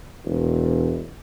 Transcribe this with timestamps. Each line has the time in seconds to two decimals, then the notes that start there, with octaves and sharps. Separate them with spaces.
0.25 E1